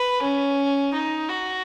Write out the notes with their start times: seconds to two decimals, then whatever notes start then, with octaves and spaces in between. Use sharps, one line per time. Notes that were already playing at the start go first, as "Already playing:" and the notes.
Already playing: B4
0.22 C#4
0.94 D#4
1.29 F#4